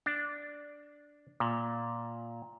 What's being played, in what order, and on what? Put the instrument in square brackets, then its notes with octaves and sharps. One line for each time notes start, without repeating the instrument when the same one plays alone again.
[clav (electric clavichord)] D4
A#2